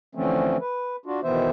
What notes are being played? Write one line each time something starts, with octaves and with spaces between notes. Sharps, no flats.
D3 E3 F3 A3 C4 C#4
B4
D4 F4 F#4
B2 D#3 E3 B3 C5 E5